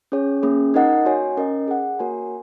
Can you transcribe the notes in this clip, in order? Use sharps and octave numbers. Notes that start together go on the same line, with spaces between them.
C#4 G#4 C#5
A#3 C#4 G#4
D#4 A#4 D#5 F#5
F#4 C#5 G#5
C#4 A#4 D#5
G#4 F#5
A#3 F#4 A#4 C#5 G#5